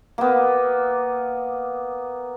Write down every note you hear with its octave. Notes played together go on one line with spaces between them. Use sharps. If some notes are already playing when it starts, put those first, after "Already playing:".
A#3 B3